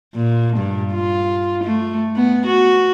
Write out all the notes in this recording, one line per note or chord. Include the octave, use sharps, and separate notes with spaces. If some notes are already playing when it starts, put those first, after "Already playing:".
A#2
G2
F4
A3
B3
F#4